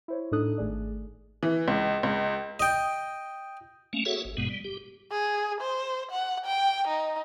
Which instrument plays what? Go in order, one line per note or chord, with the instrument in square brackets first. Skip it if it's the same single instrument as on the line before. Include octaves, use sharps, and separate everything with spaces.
[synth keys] E4 C5 C#5
A2 D4 D#4 A4 D#6 F#6
G#1 A3 G#4 D5
[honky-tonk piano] E3
C#2
C#2
[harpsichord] D#5 G5
[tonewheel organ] A3 A#3 C#4
F#4 G#4 A4 C#5 E5 F#5
G#1
G2 B2 G#3 B3
G3
G4
[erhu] G#4
C5
F#5
G5
D#4